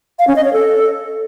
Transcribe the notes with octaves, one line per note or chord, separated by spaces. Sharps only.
F5
C#4
D#5
C#5
A4